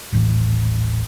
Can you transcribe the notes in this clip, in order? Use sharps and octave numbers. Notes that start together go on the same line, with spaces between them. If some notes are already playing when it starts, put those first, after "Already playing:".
D#1 A1 A2 E3